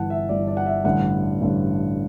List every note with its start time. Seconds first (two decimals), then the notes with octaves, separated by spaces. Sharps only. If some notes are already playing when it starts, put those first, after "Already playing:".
Already playing: G1 G2 E3 F#5 A5
0.10 E5
0.29 G1 G2 E3 D5
0.48 D5
0.57 F#5
0.66 E5
0.84 A1 G2 D3 F#5
1.40 A1 G2 D3